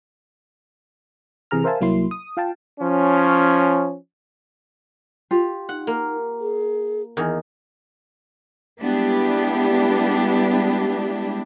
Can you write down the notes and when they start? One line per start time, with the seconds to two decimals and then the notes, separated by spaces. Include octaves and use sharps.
1.51 C3 E3 G#4 A#5 F6
1.64 A#4 C5 E5 F5 G#5 A5
1.81 C2 F#3 A#3 E4 C6
2.11 D#6
2.37 F4 F5 G5 A5
2.80 F3 C#4
5.31 F4 G4
5.69 D#4 F#5
5.87 A#3
6.40 G#4
7.17 E2 D#3
8.81 G3 G#3 B3 D4 E4 G4